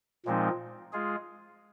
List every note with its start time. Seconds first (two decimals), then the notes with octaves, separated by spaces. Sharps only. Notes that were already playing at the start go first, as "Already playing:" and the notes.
0.26 A#2 F3 G#3 C4 D#4
0.93 G#3 F4 G#4